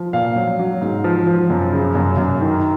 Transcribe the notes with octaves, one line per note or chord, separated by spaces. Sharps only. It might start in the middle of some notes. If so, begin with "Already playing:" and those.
Already playing: F3
A#2 F5
F#3
F#3
G#2
F3
F3
F#2
C#3
F#2
F#2
D#3